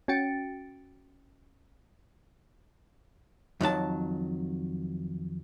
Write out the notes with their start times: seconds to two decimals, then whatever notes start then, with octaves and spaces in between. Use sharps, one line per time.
0.08 C#4 F#4 G5 A6 C#7 D7
3.61 F2 D#3 F#3 A5